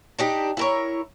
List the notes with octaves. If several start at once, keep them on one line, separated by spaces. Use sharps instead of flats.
D4 D#4 G4
E4 A#4 C#5